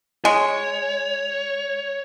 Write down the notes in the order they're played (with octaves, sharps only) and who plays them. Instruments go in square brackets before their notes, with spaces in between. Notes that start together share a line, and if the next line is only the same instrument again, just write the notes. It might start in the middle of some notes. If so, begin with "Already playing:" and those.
[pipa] G#3 [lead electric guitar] C#5